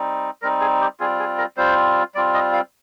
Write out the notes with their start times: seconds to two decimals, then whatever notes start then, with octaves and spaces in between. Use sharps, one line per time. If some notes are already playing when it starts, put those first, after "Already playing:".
Already playing: G3 C4 D#4
0.42 G3 C4 D#4 A#4
0.61 G#4
0.81 G4
1.00 G3 C4 F4 G#4
1.19 G#4
1.38 A#4
1.57 G3 C4 F4 C5
2.15 G3 C4 F4 D5
2.34 D#5
2.53 F5